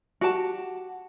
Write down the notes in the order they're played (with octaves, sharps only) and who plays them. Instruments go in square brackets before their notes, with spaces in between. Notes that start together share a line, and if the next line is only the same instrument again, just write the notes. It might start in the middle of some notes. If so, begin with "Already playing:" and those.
[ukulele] F#4 G4 A5